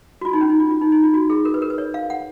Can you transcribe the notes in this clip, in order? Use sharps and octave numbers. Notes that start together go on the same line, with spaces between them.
F#4
F4
D#4
C#4
D#4
F4
F4
D#4
D#4
F4
F#4
G#4
A#4
B4
A#4
B4
C#5
F5
F#5